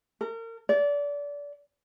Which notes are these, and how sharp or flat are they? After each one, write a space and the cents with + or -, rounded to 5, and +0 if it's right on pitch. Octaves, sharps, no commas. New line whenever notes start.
A#4 -35
D5 -25